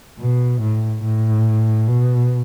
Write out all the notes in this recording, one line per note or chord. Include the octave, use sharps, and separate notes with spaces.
B2
A2
A2
B2